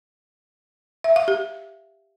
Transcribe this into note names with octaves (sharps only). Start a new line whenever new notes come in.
E5
F5
G4